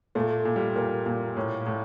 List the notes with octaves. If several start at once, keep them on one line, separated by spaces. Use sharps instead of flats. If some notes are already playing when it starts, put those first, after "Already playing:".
A#2 A3
A#2
G3
A#2 A#3
A#2
A2
A2